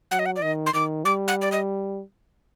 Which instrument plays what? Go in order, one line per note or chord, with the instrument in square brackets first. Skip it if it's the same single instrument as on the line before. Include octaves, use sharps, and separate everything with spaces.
[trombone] F#3 [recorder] F#5
[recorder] D#5
F#5
D5
[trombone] D#3 [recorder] D#5
[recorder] C6
[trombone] D#3 [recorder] D6
[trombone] G3 [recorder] D6
[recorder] F#5
D5
D#5